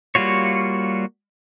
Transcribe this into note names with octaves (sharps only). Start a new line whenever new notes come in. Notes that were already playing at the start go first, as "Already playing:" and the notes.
G3 A#3 F4 F#4 C#5